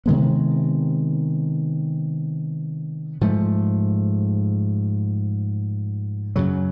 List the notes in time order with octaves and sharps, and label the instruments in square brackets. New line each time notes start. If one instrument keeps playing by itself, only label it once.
[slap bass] C3 D#3 G#3 B3
G#2 F3 A3
F#2 C#3 F#3